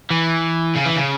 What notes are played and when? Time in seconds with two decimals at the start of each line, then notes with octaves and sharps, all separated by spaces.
0.10 E3
0.75 C#3
0.85 E3
0.96 C#3